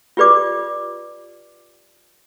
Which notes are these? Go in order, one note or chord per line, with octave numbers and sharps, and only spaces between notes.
F4 G4 B4 D5 D6